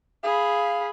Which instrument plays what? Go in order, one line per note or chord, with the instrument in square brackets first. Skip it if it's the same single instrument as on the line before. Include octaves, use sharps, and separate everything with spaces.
[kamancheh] G#4 B5 [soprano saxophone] F5